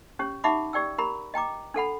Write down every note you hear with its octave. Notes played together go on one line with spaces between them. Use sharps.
C#4 G4 C#5
D#4 G4 E5 F#5 B5 D6
G4 D5 G5 E6
G4 A#4 A#5 B5
D#5 G5 A#5 D6
D4 A4 F#5 B5